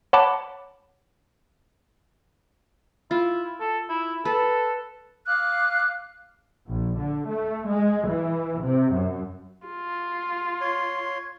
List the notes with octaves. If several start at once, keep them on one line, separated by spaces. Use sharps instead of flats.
C#5 F#5 A5 B5 D6
E4 F4
A4
E4
A4 B4
F5 D6 F6 F#6
A#1
D3
A3
G#3
E3
C3
F#2
F4
C#5 C6